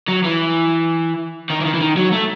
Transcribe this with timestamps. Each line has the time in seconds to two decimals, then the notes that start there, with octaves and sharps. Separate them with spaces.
0.09 F#3
0.25 E3
1.50 D#3
1.61 E3
1.65 D#3
1.74 E3
1.81 D#3
1.97 F#3
2.12 A3